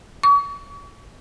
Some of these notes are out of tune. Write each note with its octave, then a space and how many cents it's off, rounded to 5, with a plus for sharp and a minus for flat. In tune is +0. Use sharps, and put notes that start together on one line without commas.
C#6 +40